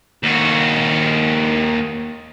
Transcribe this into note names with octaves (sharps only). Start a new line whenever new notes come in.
D#2 F#4